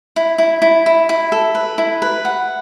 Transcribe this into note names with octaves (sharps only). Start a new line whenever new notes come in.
E4
E4
E4
E4
E4
A4
B4
E4
B4
F#5